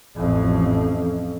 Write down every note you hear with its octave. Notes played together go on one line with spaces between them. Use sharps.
A1 F2